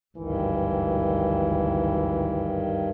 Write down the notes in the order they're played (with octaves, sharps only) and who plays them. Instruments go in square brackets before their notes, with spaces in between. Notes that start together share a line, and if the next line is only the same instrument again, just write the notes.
[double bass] G#1 D2 [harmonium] G2 D#3 [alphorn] E3